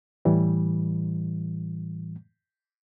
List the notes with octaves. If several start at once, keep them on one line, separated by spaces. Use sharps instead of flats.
A2 E3 G3